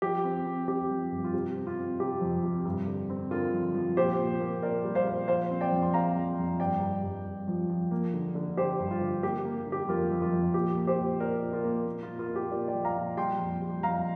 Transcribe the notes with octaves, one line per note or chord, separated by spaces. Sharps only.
F3 G4
C4
C4
C4 G4
F3
G2
F4
C3 G4
C4
F4
C4
C3 G4
F2
C3
G2
D3
C4
D3 F4 A#4
F3
F3
A#2 G4 C5
A#2
A#3
A#2 A#4 D5
G3
C5 F5
A#2
F3 C5 F5
C4
D5 G5
F2
C6
C4 F5 A#5
F3
F2
G2 D5 G5
G2
G2
G2
F3
F3
A#3
D3
D3
D3 G4 C5
G2
F4
D3
A#3 G4
A#3
D3
G4
F2 F4 A#4
F2
F4 A#4
F2
A#2 G4
A#3
G4 C5
A#2
A#3 A#4 D5
A#2
F4 A#4
A#3
A#2
F4
A#2
F4 A#4
A#2
G4
A#2 A#4 D5
D5 G5
F3
F5 A#5
A#2
G3 G5 C6
F2
G3
F2 F5 A#5